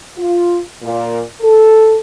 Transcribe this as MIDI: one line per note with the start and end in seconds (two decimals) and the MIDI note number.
0.17 0.59 65
0.82 1.22 46
1.41 1.98 69